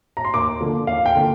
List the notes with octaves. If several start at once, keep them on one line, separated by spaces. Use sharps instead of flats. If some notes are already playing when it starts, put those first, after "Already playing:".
A#5
C6
D#2 D6
D3 F3 A#3
D#2 F5
G5
D3 F3 A#3